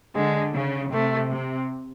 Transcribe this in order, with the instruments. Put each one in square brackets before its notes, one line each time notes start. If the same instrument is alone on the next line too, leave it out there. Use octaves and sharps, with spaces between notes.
[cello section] D3 [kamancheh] G#3
[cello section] C#3
[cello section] C3 [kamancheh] A3
[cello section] C3